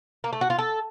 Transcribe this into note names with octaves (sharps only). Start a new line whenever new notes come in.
A#3
A3
F#4
F4
A4